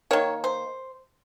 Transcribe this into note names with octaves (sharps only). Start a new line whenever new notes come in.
D#3 A#3 C#5
C5